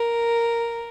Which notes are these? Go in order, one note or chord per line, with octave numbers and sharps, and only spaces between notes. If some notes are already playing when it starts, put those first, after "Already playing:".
Already playing: A#4